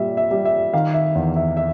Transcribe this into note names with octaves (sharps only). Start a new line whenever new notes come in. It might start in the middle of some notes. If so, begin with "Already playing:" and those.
Already playing: A#2 G3 E5
E5
G3
E5
D#3 F5
E5
E2
E5
E5